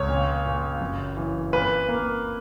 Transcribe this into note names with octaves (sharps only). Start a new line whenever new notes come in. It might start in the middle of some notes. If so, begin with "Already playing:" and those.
Already playing: C#2 C#5
A#2
A#2
F#1
E3
A#2 B4
A#3